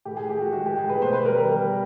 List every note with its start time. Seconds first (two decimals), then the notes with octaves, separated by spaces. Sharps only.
0.05 A2 G4
0.17 G#4
0.29 A2 G4
0.41 F#4
0.53 G#3 F#4
0.66 G4
0.77 A2 G#4
0.90 B4
1.02 B2 C5
1.13 B4
1.25 G3 A#4
1.38 A#4
1.49 G3